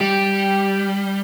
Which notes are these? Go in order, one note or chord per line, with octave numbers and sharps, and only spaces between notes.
G3 G4